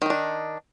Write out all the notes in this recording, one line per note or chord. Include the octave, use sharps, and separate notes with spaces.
D#3 D4 D#4